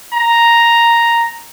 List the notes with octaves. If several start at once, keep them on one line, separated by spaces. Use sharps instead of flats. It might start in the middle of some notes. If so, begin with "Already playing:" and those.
A#5